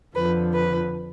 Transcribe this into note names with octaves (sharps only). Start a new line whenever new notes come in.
F2 D3 F3 B4
B4